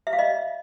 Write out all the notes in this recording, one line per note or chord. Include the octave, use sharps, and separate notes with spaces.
E5
F5
D#5